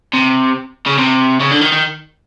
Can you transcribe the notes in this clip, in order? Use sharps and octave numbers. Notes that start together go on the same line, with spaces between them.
C3
C#3
C3
C#3
D3
D#3
D#3